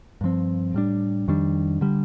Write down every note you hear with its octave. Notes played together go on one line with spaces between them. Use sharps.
G2 F3 C4
A2 G3 D4
F2 D#3 G3 D4
D3 G3